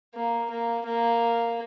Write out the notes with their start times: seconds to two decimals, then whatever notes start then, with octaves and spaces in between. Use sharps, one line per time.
0.15 A#3
0.51 A#3
0.86 A#3